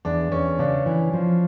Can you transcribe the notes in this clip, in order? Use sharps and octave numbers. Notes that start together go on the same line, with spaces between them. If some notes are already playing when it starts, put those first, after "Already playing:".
E2 D4
E2 C#4
C#3 D4
E3
F3